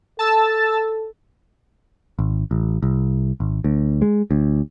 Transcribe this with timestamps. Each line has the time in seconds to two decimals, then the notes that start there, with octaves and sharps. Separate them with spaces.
0.19 A4 A5 E6 A6
2.19 G#1
2.51 A1
2.82 C2
3.40 G#1
3.64 D2
4.02 G#3
4.31 D2